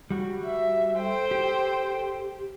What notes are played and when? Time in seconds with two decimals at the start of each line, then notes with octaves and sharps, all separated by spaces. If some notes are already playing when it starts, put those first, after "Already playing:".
0.11 G3 F#4
0.45 E5
0.98 A4 C5 G5
1.31 G4